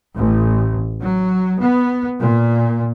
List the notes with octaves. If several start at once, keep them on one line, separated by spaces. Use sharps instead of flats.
A1
F#3
B3
A#2